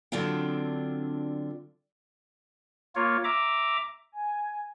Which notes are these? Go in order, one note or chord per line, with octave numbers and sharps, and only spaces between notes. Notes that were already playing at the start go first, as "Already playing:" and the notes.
D3 F#3 C4 D4 F4 G5
A#3 F4 C#5
E5 A#5 D6
G#5